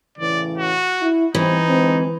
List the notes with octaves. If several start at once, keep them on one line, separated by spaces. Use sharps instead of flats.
A2 C#3 E3 D5
F#4
E4
E3 G3 B3 C4 D#4
D3 G#3 C4